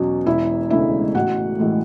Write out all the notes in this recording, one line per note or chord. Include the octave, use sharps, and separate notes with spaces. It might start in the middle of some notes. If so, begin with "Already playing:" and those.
Already playing: E2 B2 F#3 C#4
E1 E4 E5
D2 C#3 G#3 E4 E5
A1 F#4 F#5
A2 E3 G#3